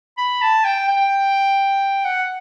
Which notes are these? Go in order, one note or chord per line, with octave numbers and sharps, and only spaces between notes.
B5
A5
G5
G5
F#5